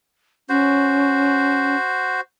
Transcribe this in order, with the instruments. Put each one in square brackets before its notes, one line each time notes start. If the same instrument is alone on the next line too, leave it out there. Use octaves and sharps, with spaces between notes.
[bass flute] C#4 [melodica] F#4 C5